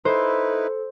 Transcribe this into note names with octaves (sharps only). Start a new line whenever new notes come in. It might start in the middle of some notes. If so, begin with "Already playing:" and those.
D#4 E4 A4 B4 C5